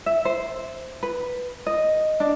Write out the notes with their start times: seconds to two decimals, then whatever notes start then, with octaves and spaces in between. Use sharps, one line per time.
0.06 E5
0.25 C5
1.03 B4
1.67 D#5
2.20 D4